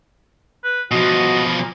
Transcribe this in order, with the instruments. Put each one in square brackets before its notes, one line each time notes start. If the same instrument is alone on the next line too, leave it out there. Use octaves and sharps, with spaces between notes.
[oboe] B4
[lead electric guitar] B2 F3 [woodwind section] F#4 [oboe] D#5
[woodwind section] A#2